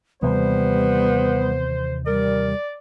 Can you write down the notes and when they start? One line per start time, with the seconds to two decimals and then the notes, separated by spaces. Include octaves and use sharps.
0.23 D#2 C3 E3 G3 B3 C5
2.07 G3 A#4 D5